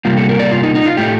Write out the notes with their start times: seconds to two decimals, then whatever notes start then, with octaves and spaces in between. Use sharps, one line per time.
0.05 C3 G3 A#3 F4
0.17 A4
0.29 A#4
0.39 D5
0.52 F4
0.63 D#4
0.75 D#4
0.86 F4
0.97 A2 A3 G4